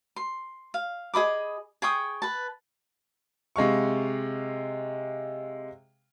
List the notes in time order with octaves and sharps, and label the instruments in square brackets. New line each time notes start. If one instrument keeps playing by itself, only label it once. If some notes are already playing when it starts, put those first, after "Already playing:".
[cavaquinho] C6
F5
G#4 D#5 B5 D6
G#4 G5 C#6 D#6
B4 A5
[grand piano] C3 G#3 F5 C#6